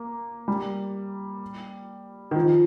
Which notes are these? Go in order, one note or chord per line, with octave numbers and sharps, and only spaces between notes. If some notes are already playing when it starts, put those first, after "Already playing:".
Already playing: A#3
G3
D#3
F3